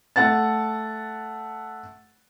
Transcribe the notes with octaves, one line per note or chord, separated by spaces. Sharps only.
A3 F#5 A5 A6